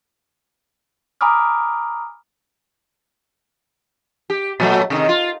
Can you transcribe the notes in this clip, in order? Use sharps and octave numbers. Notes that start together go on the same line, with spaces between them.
G#5 A#5 B5 D6 D#6 F6
G4
A#2 F#3 A3
C3 D#3
F4